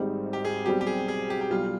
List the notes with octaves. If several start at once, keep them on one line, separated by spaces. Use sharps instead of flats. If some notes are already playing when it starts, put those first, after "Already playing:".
Already playing: G#1 G#2 G3 C4 D#4
G4
G#4
B1 B2 G3 C4 G4
G4
G#4
G#4
G4
G4
B1 B2 G3 F4